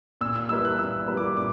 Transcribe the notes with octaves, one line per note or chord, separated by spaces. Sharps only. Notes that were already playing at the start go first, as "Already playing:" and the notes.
A#2 E6
E6
G3 A#3 E4 B4 E6
F#6
A#2 E6
G3 A#3 E4 B4
D6
A#2 D6